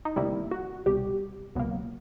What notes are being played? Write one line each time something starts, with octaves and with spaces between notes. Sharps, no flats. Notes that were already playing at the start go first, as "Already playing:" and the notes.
D#4
D2 C3 D#3 G3 A#3 E4
F#4
C2 B2 G3 G4
C#2 B2 F#3 A#3